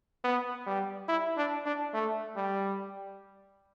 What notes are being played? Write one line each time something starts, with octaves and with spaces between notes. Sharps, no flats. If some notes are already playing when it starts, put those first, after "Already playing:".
B3
G3
E4
D4
D4
A3
G3